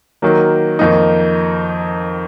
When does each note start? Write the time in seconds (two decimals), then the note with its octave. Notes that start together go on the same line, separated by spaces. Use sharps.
0.22 D#3 F#3 A#3
0.79 F2 D#3 A#3 D#4